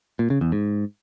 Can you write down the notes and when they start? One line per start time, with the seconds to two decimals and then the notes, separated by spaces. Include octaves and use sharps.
0.19 A#2
0.30 C#3
0.41 E2
0.52 G#2